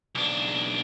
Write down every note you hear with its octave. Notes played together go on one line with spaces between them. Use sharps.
B1 D4